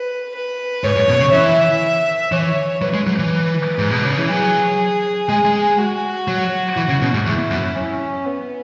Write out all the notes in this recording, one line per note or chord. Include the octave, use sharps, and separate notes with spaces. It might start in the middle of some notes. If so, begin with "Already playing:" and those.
Already playing: B4
B4
G#2 C#5
F#2
B2
C#3
E3 E5
E3 C#5
F#3 B4
G#3
F#3
E3
G#2
B2
C#3
E3
F#3 G#4
G#3 G#4
G#3
F#4
F#3
E3
C#3
B2
G#2
E2 E4
F#2
C#4
B3